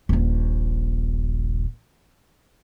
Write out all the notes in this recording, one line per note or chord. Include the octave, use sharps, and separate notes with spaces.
D#1 A#1